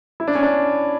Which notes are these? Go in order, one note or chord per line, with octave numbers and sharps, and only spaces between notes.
E4
D4
C#4
D4